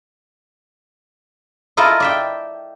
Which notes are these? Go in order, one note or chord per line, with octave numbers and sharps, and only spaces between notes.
E4 F4 A4 A#4 D#5
D5 E5 G5